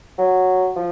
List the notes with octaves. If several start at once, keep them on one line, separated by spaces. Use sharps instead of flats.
F#3
F3